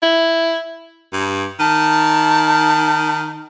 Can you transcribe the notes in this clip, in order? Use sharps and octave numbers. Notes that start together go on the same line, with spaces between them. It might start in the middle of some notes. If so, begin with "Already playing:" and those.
E4
G2
D#3 A5